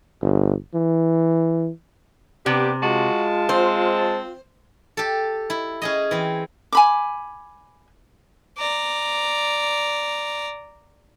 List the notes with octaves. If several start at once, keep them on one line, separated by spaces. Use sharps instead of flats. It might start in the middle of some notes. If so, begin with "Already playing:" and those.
G1
E3
C3 B3 D4 G4
G#3 F4 F#4 A5
C4 C5
G4 A4
E4
C#4 G#4 D#5
E3 C4
G#5 B5 D6
D5 A#5